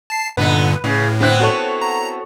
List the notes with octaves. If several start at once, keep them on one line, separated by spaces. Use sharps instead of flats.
A5 C7
G2 A#2 D3 B3 D#4 B4
A2 C#3
D3 B3 C4 E4 F#6
F#4 A4 C#5
A#5